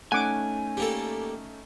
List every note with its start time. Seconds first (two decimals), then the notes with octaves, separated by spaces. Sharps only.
0.12 A3 C#4 D#4 F#5 G#5 D6
0.77 G3 A#3 A4